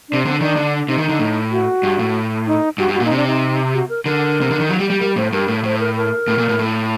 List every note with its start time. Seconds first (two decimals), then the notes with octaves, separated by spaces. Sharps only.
0.09 C3 D4
0.25 D3 C4
0.41 D#3 D4
0.56 D3
0.88 C3 D#4
0.98 D#3
1.04 D3 D#4
1.19 A2
1.52 F#4
1.83 G2
1.99 A2
2.47 D#4
2.78 G2 F#4
2.89 G2
2.94 F#4
3.00 A#2
3.05 D#4
3.10 C3
3.16 D4
3.27 D#4
3.74 F#4
3.89 A#4
4.05 D3 A#4
4.41 C3
4.51 D3
4.60 D#3
4.69 F#3
4.79 G3
4.90 G3
5.01 G3 A#4
5.16 A2 C5
5.33 G2 A#4
5.48 A2
5.63 A2 C5
5.80 A#4
5.96 A#4
6.28 A2
6.38 A#2
6.49 A2
6.59 A2